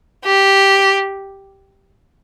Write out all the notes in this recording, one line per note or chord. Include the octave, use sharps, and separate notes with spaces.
G4